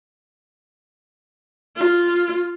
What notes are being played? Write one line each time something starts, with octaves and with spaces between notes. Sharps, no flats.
F4